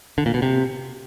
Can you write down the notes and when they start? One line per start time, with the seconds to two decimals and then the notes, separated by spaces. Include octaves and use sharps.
0.18 D3
0.26 A#2
0.34 B2
0.42 C3